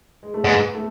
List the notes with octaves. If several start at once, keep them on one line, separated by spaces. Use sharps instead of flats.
G#3
A3
G#2 B3
A3